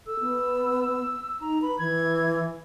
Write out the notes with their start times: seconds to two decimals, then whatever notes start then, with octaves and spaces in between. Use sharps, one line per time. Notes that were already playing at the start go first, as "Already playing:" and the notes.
0.07 A4 E6
0.20 B3
1.41 D#4 A#5
1.62 B4 B5
1.79 E3 G#6